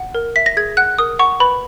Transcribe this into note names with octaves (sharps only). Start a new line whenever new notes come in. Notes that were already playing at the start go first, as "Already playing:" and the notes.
Already playing: F#5
A#4
E5 B6
A#6
G#4 G#6
F#5 F#6
A#4 D#6
F#5 C#6
B4 B5